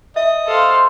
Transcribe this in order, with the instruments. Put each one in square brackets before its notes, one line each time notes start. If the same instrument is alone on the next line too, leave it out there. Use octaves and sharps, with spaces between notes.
[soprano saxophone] D#5 [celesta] E5
[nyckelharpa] A4 F5 [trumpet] C5